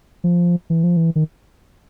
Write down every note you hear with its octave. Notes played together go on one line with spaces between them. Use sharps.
F3
E3
F3
E3
D#3